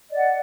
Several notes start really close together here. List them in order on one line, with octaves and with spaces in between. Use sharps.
D#5 D5 F#5